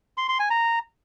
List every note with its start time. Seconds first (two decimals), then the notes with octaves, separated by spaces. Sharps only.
0.17 C6
0.28 C6
0.39 G#5
0.50 A#5